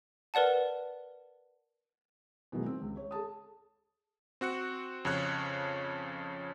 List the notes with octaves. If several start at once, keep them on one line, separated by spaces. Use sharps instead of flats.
A#4 B4 D5 F#5 A5
B2 D#3 E3 F#3 G#3
C4
C#2
C#5
G#4 A4 A5 D#6
C4 F#4 F#6 C#7
F2 C#3 C#5 F#6